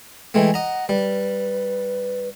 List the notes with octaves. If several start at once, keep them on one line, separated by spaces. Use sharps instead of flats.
E3 G#3 A3 G5
D#5 F#5 A#5
G3 B4